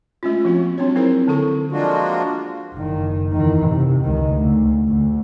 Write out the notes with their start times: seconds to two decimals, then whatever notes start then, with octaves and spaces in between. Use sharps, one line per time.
0.23 G#3 A3 C#4 F4
0.45 F3 A#3 C4 F#4
0.78 F#3 C4 D4 F#4 C#5
0.96 C4 D#4 E4 G#4 A#4 C5
1.28 D3 C4 E4 A4 C#6
1.72 F3 G#3 A#3 D4 F4 F#4
2.74 F#1 D#3
3.32 E2 D#3
3.69 C3
4.03 C#2 D#3
4.34 D2
4.89 D2